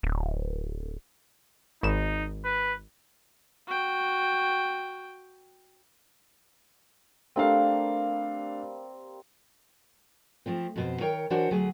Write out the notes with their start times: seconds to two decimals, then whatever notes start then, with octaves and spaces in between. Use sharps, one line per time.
0.03 D1
1.83 G#1 D#4 E7
2.44 B4
3.67 F#4 G5
7.36 G3 A3 A#3 C4 D4 F5
10.46 F3 A3 C4
10.76 F2 B2 C5
11.00 D#3 A#4 C#5 G5
11.30 E3 D4 F#4 A#4 C5 C#5
11.50 D2 F#3 A3 G#4